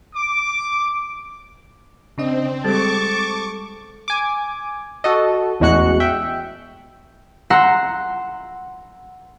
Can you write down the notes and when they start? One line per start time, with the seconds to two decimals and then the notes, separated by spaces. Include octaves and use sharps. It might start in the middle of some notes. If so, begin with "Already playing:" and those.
0.15 D6
2.18 C#3 C4 D4 D#5
2.64 G3 G#3 A4 A5 C#6 D6
4.08 G#5 D6
5.04 F#4 A4 D#5
5.60 A1 E2 G#3 F#4 F#6 C#7
6.00 E5 G5
7.50 F#5 A#5 C6 E6 C7 C#7